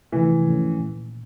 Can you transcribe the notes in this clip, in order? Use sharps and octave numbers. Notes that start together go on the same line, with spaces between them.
C3 E3 F3 A3
G#2 F3 A3 C#4
A#2